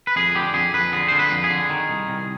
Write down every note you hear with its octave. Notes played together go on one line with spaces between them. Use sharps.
B4
F2 G#4
D3 G4
F2 G#4
F2 B4
D3 G#4
D3 C5
B4
F2
G#4
D3
D#3
C2
C2